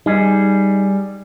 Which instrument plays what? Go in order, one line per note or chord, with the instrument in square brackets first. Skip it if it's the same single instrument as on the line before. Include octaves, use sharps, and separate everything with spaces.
[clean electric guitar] G3 G#4 [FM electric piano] D#4